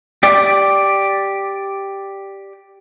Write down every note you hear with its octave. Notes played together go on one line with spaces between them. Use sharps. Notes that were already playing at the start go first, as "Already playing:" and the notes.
G4 D5